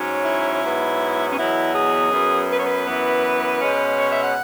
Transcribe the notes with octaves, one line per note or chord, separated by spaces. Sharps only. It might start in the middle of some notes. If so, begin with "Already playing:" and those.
Already playing: G#2 F#3 C#4
E4
G#2 F#3 B3
C#4
E2 B2 F#3 B3 E4
G#4
F#2 F#3 B3
B4
C#5
B4
F#2 E3 B3
B2 G#3 C#4
C#5
E5
F#5